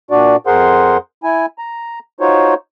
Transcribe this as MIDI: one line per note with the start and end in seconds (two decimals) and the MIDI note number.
0.11 0.36 46
0.11 0.36 62
0.11 0.36 66
0.11 0.36 74
0.47 0.97 41
0.47 0.97 68
0.47 0.97 70
0.47 0.97 72
0.47 0.97 78
0.47 0.97 84
1.24 1.46 64
1.24 1.46 80
1.58 1.99 82
2.20 2.54 63
2.20 2.54 65
2.20 2.54 66
2.20 2.54 72
2.20 2.54 73